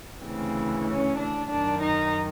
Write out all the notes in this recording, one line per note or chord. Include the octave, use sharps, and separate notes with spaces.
D2 C#3 E3 C4
C#4
D4
F#2 D#3 D4
D#4